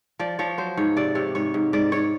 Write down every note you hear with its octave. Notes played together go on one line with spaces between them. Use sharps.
F3 D5
F3 C#5
F#3 C5
G#2 C#5
C3 D5
C3 C#5
G#2 C#5
G#2
G#2 D5
G#2 C#5